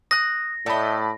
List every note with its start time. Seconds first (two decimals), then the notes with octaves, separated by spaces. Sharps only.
0.11 D#6 F#6 A#6
0.66 A2 A3 D5 D#5 A5 B5